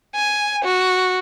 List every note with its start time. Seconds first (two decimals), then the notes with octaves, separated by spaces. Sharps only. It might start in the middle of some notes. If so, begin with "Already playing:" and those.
0.15 G#5
0.65 F#4